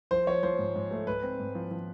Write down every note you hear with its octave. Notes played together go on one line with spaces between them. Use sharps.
F3 C5
F3 C#5
F3 C5
G#2
G#2
A3
G#2 B4
C4
G#2
F3
F3